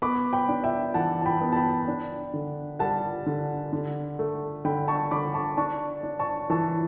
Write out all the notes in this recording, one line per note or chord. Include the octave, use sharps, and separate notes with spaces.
B3 B5 D6
G5 B5
D4
E5 G5
E3 F#5 A5
A5
G5 B5
B3
A5
G5 B5
D4
D3
G3 F#5 A5
D3
D3
A3
D3 G5 B5
A5 C#6
D3 B5 D6
A5 C#6
D4 A5 C#6
D4
A5 C#6
E3 A5 C#6